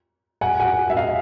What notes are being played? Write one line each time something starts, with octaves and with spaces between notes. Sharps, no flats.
F#5 G#5
F#5 G#5
E5
D#5 F5